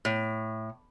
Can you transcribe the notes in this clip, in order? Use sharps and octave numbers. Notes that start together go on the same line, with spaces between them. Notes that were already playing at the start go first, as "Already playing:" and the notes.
A2